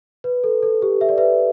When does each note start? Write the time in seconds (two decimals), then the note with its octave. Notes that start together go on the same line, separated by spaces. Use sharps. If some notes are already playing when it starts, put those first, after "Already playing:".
0.24 B4
0.44 A4
0.63 A4
0.82 G4
1.01 E5
1.09 D5
1.18 B4 E5